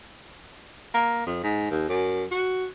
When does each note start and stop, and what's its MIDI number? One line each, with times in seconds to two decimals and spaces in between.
0.94 1.24 58
1.27 1.39 41
1.43 1.67 44
1.71 1.86 39
1.89 2.24 42
2.32 2.66 66